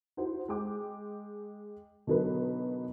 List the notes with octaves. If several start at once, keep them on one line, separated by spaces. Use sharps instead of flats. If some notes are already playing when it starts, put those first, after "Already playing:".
D#4 E4 F#4 C5
G#3 G5 D6
B2 D3 F#3 D#4 A#4 B4